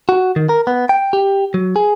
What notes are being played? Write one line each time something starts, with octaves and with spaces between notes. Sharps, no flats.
F#4
D#3
A#4
B3
G5
G4
F#3
G#4